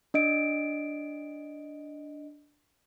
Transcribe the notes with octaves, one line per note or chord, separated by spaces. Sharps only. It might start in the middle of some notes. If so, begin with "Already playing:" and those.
D4 D#5 D7